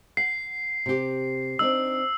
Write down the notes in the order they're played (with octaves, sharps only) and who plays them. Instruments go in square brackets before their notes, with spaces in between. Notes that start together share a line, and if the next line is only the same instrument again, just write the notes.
[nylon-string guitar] F#5 [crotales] C7
[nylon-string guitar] C3 G4
[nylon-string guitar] C4 D4 D#4 [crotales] E6